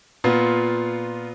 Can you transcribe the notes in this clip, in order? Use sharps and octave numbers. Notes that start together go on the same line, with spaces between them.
A#2 B3 F4